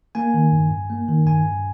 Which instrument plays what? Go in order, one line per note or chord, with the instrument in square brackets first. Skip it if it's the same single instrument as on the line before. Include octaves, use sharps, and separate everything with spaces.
[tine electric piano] A#3 G#5
D#3
G2
G2
A#3
D#3
G2 G#5
G2